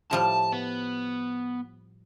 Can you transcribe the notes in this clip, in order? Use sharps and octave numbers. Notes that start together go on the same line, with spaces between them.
A2 F3 G3 A5
B3